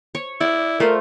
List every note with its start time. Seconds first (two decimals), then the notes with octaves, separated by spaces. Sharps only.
0.15 C#5
0.41 E4 D5
0.80 A3 F4 A#4 C5